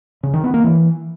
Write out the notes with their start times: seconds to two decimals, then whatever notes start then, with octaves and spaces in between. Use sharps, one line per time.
0.23 C#3
0.33 D#3
0.44 B3
0.54 A#3
0.64 E3